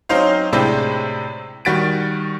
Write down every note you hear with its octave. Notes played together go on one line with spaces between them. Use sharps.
F#3 C4 C#4 D#4 C5 F5
A2 C3 G#3 C4 D4 E4
D#3 G3 F#4 A6 B6 D7